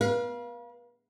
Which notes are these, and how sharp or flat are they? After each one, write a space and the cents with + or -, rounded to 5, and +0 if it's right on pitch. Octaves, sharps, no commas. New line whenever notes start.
B4 -45 F5 +0